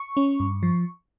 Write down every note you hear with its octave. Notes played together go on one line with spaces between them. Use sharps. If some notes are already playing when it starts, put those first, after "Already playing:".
Already playing: C#6
C#4
G2
F3